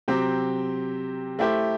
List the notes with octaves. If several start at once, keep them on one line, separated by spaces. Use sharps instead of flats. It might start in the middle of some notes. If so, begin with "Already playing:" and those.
C3 F#3 C4 G4
A3 E4 G4 C5